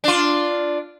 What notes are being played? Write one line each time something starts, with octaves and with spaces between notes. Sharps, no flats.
D4 F4